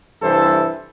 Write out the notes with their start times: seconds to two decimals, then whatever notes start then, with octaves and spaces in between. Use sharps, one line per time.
0.22 C2 G2 E3 E4 A4 C5